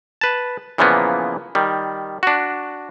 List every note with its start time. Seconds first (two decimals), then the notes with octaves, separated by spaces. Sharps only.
0.21 B4 A5
0.78 A#2 C#3 E3 F3 A#3 B3
1.55 D#3 G3
2.23 D4 F#4